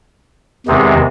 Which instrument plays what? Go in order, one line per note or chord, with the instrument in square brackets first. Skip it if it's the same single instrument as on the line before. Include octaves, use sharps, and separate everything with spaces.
[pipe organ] E2 C3 D#3 G#3 C4